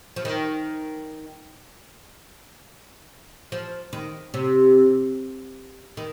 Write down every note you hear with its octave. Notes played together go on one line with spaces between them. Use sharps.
F3
D#3
F3
D#3
C3
D#3